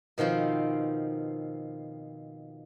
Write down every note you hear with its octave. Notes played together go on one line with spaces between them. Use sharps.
B2 D#3 F3 C4 F4